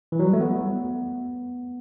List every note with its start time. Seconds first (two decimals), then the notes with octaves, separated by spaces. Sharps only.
0.12 E3
0.19 F#3
0.26 G3
0.33 A3
0.40 B3